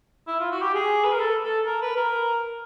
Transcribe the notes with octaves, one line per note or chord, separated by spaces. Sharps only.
E4
F4
F#4
G4
G#4
B4
A#4
A4
A4
A#4
B4
A#4